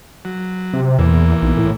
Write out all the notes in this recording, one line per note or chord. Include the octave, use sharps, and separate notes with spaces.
F#3
C3
E2 A#2 E3
B1
A2